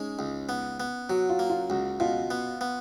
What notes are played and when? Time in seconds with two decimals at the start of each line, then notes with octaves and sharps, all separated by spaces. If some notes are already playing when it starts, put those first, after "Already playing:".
Already playing: G#3 C#4 D#4
0.19 C#2
0.49 B3
0.80 B3
1.09 F#3 F#4
1.29 F4
1.39 A#3
1.50 F4
1.70 C#2 F#4
2.00 B2 F4
2.31 B3
2.61 B3